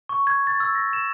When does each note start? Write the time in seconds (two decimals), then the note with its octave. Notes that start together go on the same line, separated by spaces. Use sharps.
0.09 C#6
0.27 G#6
0.47 A6
0.60 E6
0.75 A#6
0.93 E7